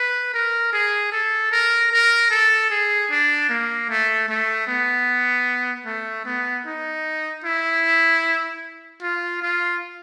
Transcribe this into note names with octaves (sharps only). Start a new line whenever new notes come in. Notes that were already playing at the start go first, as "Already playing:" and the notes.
Already playing: B4
A#4
G#4
A4
A#4
A#4
A4
G#4
D4
A#3
A3
A3
B3
A3
B3
D#4
E4
F4
F4